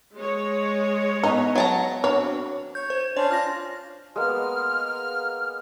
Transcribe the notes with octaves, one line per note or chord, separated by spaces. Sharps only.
G#3 C#5
B3 D#4 D#5 G#5
F#3 A5 A#5
C4 D4 F#4 C#5
C#5 G6
C5
C#4 D4 C5 C#5
D4 F4 F6 A#6
G#3 A#3 B3 F6